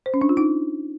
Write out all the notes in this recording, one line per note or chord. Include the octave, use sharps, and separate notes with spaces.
C5
C#4
D4
F4
D#4